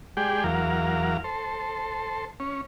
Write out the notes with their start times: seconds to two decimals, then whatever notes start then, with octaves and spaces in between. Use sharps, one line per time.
0.17 G#3 G4 G#4 D5 G5
0.44 E2 F#3 A#4 F5
1.24 A4 C5
2.40 C#4